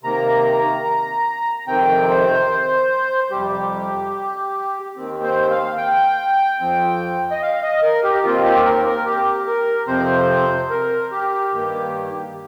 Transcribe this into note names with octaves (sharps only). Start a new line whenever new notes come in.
C3 D#3 A#3 A#5
F2 C3 D#3 C4 G5
C5
F2 C3 G3 G4
D#2 D#3 C4
C5
F5
G5
F2 F3 C4
D#5
F5
D#5
A#4
G4
D#2 D#3 C4 F4
G4
A#4
A#4
G4
A#4
F2 C3 F3 C4 C5
A#4
G4
G2 D#3 A#3